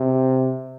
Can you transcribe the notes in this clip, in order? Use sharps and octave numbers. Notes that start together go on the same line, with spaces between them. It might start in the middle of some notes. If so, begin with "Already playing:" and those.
Already playing: C3